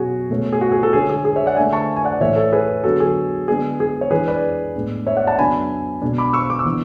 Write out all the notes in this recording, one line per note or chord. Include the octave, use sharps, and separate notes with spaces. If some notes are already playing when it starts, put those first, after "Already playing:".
Already playing: B2 F#3 C#4 F#4 G#4
B2 A3 C#4
G#4
F#4
G#4
F#4 A4
D3 G#3 C#4 G#4
G#4
G#4
C#5 E5
D5 F#5
D3 A3 C#4 E5 G#5
A5 C#6
G#5
D5 F#5
A2 E3 A3 C#5 E5
A4 C#5
G#4 B4
D3 F#3 B3 F#4 A4
G#4
D3 G#3 B3 D4 G#4
G#4
C#5
E3 G#3 D4 G#4 B4
B4 D5
A2 G#3 B3 D4
C#5 E5
D5 F#5
F#5 A5
C#3 F#3 B3 D4 G#5 B5
B2 G#3 D4
B5 D6
C#6 E6
D6
E6
E3 B3 D4